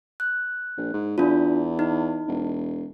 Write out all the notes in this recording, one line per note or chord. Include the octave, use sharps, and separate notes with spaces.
F#6
A#1
G#2
E2 D4 F4
D#4
E1